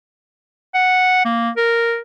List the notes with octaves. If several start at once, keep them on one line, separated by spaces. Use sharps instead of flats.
F#5
A#3
A#4